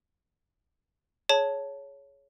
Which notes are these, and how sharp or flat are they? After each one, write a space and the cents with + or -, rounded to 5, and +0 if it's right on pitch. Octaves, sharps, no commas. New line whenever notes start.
G#4 +20 C#5 +5 A5 +0